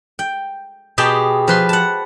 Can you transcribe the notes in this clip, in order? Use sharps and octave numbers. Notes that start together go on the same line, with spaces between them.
G5
B2 G4 G#4 G5 A5
F3 B4 C6
F#5 A5